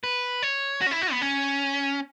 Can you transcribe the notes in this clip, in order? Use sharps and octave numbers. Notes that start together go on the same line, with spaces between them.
B4
C#5
F#4
C#4
E4
F#4
B3
C#4